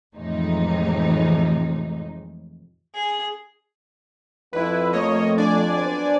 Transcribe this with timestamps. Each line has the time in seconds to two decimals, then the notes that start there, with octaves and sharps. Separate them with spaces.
0.16 F2 A2 C3 E3 G#3 D#4
2.94 G#4
4.53 F2 E4 B4
4.93 F3 A3 A#3 C#5 D#5
5.38 D4 D5 G#5
5.77 F#3 B3 C5